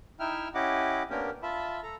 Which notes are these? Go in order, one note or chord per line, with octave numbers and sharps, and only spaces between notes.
D#4 E4 E5 G5 F6
C#4 E4 G4 D#5 F#5 D6
A#3 B3 C#4 D4 G4 A#4
F4 E5 A5 B5
A4 A#5